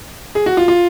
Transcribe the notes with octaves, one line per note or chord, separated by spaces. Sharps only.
G#4
F#4
F4
F4